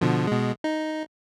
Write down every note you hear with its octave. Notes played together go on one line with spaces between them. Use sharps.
B2 D3 F3
B2 G#3
D#4